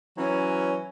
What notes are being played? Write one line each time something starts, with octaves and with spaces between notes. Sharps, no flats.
E3 F#3 C#4